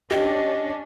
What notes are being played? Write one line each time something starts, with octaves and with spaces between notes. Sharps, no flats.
C#4 D4 G4 D#5